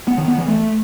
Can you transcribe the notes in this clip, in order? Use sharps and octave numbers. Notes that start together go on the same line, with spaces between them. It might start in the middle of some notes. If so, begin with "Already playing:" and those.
B3
D#3
B3
E3
A3